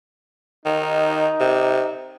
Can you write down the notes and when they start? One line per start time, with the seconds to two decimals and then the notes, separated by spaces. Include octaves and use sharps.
0.66 D#3 D#4
1.40 C3